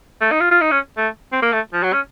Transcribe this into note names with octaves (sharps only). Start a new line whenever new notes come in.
A3
D#4
F4
F4
D#4
C#4
A3
C4
A#3
A3
F3
F#3
C#4